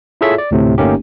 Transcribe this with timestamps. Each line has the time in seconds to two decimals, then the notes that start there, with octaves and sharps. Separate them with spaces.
0.21 E4 F4 G#4 A4 C#5 E5
0.38 D5
0.51 D2 A2 C3
0.78 G1 A3 A#3 C#4 D#4 G4